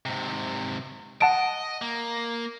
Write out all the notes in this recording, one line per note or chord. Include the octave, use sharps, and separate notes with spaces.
G#2 C3
D#5 F#5 A5 D7
A#3